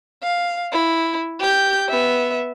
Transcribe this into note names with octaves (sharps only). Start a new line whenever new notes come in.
F5
E4
G4 G6
B3 E5